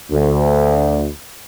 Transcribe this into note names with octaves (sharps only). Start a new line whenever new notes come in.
D2